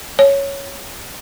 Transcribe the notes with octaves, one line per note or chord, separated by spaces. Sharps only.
C#5